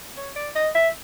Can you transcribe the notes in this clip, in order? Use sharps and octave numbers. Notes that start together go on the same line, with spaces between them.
C#5
D5
D#5
E5